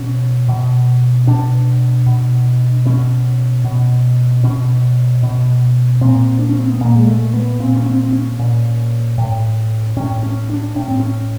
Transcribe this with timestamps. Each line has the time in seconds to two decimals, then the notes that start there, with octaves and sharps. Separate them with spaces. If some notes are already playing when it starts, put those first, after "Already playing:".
Already playing: B2 C#4
0.48 B2
1.27 B2 D4
2.06 B2
2.86 B2 C#4
3.64 B2
4.43 B2 C#4
5.23 B2
6.01 A#2 C4
6.39 D4
6.49 C#4
6.60 C4
6.70 B3
6.81 A#2 A#3
6.96 G#3
7.07 A3
7.34 B3
7.60 A#2 C4
7.76 C#4
7.86 C4
8.03 C4
8.13 C#4
8.39 A#2
9.18 A2
9.96 A2 C#4
10.23 C#4
10.50 D4
10.76 A2 C#4
10.88 C4
11.00 C#4